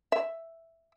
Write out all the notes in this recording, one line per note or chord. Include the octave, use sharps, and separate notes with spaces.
E5